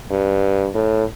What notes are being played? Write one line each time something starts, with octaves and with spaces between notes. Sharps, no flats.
G2
A2